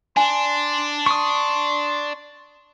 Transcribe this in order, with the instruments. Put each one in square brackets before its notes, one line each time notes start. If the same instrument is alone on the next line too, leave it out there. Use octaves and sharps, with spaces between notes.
[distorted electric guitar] D4 [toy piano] G#5 [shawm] C6
[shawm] C6 [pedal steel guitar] C#6 D#6